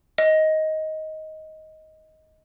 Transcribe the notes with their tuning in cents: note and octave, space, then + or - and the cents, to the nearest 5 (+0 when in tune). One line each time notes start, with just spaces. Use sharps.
D#5 +10